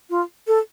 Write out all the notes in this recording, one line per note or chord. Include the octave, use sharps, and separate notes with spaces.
F4
A4